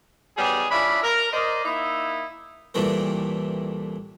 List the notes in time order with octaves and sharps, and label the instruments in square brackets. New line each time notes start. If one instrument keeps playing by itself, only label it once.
[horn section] D#3 F#3 G3 B3 G#4
C#3 D4 E4 F4 B5
A#4
A#4 C5 D5 D#5
A#3 D#4 E4
[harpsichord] C2 A#2 E3 G3 A3 A#4